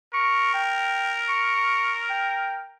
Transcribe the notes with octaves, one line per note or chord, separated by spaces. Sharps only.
A#4 C#6
G5
C#6
G5